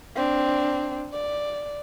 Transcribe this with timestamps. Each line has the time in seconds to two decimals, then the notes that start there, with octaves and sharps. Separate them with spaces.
0.16 C4 D4
1.13 D5